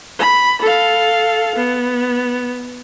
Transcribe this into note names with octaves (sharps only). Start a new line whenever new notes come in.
B5
A4 F5
B3